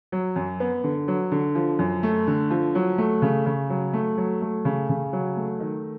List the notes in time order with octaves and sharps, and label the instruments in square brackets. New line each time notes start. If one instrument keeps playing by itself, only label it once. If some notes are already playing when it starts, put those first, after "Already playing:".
[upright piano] F#3
F#2
B3
D3
F#3
D3
F3
F#2
A3
D3
F3
F#3
A3
C#3
C#3
F#3
A3
F#3
A3
C#3
C#3
F#3
A3
D#3